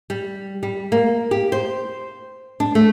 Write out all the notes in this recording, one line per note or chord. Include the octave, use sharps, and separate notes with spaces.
G3
G3
A#3
G4
C5
D4
A3